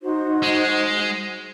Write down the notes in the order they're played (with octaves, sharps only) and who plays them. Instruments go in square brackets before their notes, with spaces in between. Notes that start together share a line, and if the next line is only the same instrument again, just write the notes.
[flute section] D#4 F#4 C5
[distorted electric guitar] G#3